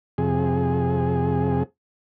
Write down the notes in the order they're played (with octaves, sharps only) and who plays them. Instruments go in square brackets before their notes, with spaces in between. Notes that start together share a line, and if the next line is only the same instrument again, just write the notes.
[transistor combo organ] F2 C3 G#4